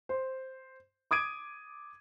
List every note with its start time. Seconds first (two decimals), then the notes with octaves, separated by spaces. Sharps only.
0.09 C5
1.11 D6 D#6 G#6 D7 D#7